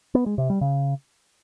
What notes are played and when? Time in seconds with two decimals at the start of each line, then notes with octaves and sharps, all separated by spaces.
0.15 B3
0.26 G#3
0.38 C3
0.50 G3
0.61 C#3